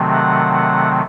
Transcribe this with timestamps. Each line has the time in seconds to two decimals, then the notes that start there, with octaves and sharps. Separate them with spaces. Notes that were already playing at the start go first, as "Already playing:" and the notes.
Already playing: C3 D#3 F#3 A3 C4
0.13 F#5
0.53 F#5